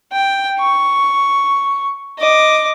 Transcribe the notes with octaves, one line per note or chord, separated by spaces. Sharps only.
G5
C#6
D#5 D6